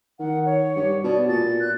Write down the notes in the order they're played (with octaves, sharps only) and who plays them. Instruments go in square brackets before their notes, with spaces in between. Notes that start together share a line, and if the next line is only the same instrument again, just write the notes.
[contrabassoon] D#3 [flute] F#5
[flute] C#5
[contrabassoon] G2
[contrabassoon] B2 [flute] D5
[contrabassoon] A#2 [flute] A6
[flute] F#6